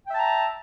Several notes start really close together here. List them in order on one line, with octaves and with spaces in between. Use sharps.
G5 E5 A5 A#5